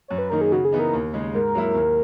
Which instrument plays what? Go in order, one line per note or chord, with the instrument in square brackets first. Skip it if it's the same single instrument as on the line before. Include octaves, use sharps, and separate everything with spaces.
[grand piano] F#2 [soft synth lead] C#5
[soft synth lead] B4
[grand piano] D#3 A#3 D#4 [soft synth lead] A#4
[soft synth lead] G#4
[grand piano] C#3 [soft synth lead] F#4
[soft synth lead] G#4
[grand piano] E3 B3 D#4
[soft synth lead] A#4
[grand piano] D#2
C#3 G#3 D#4
[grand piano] G#2 [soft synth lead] A#4
[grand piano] F#3 A#3 E4
D#2